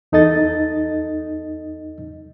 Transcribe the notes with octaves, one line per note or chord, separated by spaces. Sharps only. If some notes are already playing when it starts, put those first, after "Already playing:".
E2 D#4 A4 D#5 A6